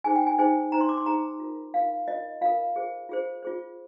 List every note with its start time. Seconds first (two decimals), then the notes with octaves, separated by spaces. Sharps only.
0.04 D#4 G#4 C5 G#5
0.16 G5
0.27 G#5
0.38 D#4 G#4 C5 G#5
0.72 D#4 G#4 C5 A#5
0.81 C6
0.89 D6
0.97 C6
1.06 D#4 G#4 C5 A#5
1.40 F4 A#4
1.74 F4 A#4 F5
2.08 F4 A#4 D#5
2.41 F4 A#4 F5
2.76 F4 G#4 C5
3.09 F4 G#4 C5
3.43 F4 G#4 C5